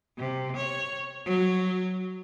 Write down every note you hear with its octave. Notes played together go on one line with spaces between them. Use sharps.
C3
C#5
F#3